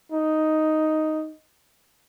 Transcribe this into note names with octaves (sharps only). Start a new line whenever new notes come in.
D#4